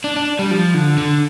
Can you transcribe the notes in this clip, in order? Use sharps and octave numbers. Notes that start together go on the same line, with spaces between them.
D4
D4
G3
F3
D3
D3